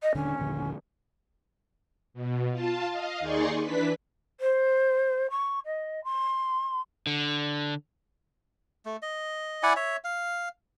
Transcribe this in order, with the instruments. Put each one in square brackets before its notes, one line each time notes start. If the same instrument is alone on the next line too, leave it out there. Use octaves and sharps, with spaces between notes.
[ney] D#5
[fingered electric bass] D#1 D3 D4 [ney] C#4
[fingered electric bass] D#1 A#1 D3
[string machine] B2
F4 A5
D#5 F5
D#2 D#4 G#4 D5 C6 C#6
E3 D4 B4 B6
[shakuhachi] C5
C#6
D#5
C6
[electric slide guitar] D3
[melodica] A3
D#5
E4 D5 F#5 G#5
C#5 E5
F5